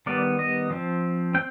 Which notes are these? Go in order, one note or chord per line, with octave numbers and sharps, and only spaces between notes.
D#3 G3 B3 D5
D#5
F3 C4
C4 G5